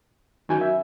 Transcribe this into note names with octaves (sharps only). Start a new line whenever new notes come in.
F#2 D#3 G#5 G6
E5